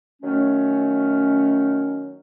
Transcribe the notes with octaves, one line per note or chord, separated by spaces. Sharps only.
D#3 F#3 A3 C#4